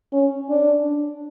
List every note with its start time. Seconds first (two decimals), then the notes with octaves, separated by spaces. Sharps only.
0.13 C#4
0.50 D4